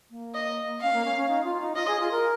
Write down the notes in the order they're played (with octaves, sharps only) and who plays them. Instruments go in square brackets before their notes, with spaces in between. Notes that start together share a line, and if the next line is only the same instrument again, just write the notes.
[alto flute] A#3
[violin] D#5
[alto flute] C#4 [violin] F5
[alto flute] A#3
C#4
C#4
D#4
F4
D#4
[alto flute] F4 [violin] D#5
[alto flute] G#4
F4
A#4